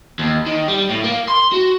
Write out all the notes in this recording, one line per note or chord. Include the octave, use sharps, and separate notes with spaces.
D#2
D#3
G3
A2
A#3
C6
F#4